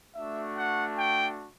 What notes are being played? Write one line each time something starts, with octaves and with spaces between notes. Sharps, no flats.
A3 D4 F#4 E5
F#5
G5